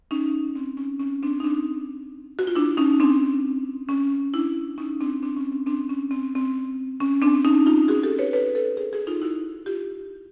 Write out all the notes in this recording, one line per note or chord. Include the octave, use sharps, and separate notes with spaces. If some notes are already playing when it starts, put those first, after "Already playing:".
C#4 D#4
C4
C#4
C#4
C4 D4
D#4
C4 D4
F#4
F4
D4 E4
C#4 D#4
C4 D4
C#4
D4 E4
C#4 D#4
C4 D4
C4 D4
C#4
C4 D4
C4 D4
C#4
C4
C4
C#4
C4 D4
C#4 D#4
D#4 F4
F#4 G#4
G4 A4
B4 C#5
B4 C#5
A4 B4
G#4 A#4
F#4 G#4
D#4 F4
E4 F#4
F4 G4